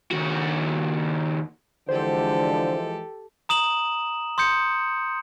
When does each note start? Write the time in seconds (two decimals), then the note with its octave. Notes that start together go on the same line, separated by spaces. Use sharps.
0.12 D#2 F#4
1.89 D3 E3 F3 G#3 G4 A4 C5
3.49 A#5 D#6 E7 F#7
4.38 C6 D#6 G6 C#7